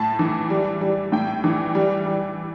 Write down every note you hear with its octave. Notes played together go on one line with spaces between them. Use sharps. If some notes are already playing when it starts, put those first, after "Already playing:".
Already playing: A2 A5
E3
G3
G3
A2 G5
E3
G3
G3